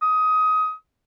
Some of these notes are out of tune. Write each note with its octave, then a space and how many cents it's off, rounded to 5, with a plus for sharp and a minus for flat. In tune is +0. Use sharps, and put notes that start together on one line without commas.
D#6 +20